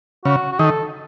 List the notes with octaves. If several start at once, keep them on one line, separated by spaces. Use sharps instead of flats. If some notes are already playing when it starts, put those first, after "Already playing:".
C#3 F#4
F#4
D#3 A4